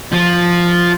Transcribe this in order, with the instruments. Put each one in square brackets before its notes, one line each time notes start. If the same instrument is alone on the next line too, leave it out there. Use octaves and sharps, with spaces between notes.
[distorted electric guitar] F3 F4